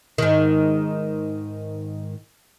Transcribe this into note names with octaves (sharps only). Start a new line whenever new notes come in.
G#2 D#3